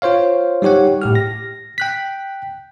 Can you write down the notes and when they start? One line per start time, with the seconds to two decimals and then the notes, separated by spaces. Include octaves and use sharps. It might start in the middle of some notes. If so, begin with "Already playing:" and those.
0.02 F4 C5 C#5 F5
0.62 G3 D#4 G4 C#5 F#5
1.02 A2 G4 F6
1.15 A#6
1.78 G5 F#6 B6